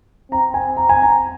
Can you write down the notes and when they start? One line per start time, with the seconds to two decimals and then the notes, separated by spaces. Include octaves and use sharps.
0.31 C4 A#5
0.54 G#5
0.77 A#5
0.89 G#5
1.02 A#5